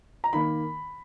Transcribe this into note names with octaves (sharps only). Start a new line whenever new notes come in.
A#5
D#3 A#3 B5